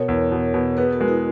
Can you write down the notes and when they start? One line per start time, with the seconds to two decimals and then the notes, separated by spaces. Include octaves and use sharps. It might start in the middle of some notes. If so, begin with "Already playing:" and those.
Already playing: B2 A#4 C#5
0.08 E2
0.31 B2
0.54 B2
0.77 B3 G#4 B4
0.93 F#4 A#4
1.01 G#3
1.08 E4 G#4